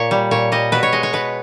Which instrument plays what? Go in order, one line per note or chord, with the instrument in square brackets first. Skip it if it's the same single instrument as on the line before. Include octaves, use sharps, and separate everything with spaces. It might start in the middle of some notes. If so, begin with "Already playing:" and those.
Already playing: [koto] A#2 C#5
G3
A#2 C#5
G3 D#5
B2 B4
C#5
G#3 D#5
C#5
B2 B4